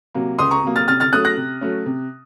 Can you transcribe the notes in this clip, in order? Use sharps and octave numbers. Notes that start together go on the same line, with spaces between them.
C3 F#3 A#3
C#2 C6 D#6
A#5 C#6
C3 F#3 A#3
F6 A6
C3 F6 A6
F6 A6
F#3 A3 C#4 D#6 F#6
F#6 A#6
C3
F#3 A3 C#4
C3